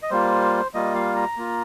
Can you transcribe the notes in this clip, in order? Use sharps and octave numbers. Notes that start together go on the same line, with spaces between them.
D#5
G3 A#3 F4 C5
G3 A#3 F4 D#5
F5
A#5
A#3 F4